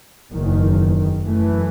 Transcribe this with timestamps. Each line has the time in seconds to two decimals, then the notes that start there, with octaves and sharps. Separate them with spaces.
0.32 F#1 E2 D#3
1.22 F#2 E3 A3